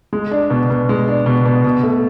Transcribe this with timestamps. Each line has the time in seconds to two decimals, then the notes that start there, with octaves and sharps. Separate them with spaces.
0.13 G#3
0.31 D4
0.50 B2
0.70 B2
0.89 G#3
1.08 D4
1.26 B2
1.46 B2
1.65 B2
1.83 A3